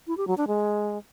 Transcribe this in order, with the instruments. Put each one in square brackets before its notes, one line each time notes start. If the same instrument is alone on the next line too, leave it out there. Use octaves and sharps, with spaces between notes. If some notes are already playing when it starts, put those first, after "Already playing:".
[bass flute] E4
G4
F#3
D4
G#3